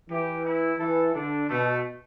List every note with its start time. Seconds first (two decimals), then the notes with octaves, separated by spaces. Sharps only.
0.09 E3 G4
0.45 E4
0.79 E3 A4
1.15 D3 D4
1.49 B2 A3